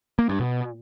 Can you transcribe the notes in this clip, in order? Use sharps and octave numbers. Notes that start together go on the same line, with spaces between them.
A#3
G2
B2